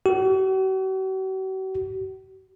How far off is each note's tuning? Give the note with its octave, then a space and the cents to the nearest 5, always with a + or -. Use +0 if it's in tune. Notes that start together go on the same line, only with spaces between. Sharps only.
F#4 +45